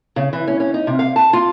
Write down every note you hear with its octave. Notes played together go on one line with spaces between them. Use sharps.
C#3
E3
C#4
C#4
D#4
C3
F5
A5
F4